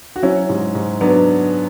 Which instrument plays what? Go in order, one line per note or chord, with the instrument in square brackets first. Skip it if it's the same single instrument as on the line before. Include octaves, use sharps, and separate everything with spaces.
[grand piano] F#4
F#3 C#4 E4
G#2
G#2
F#3 B3 D4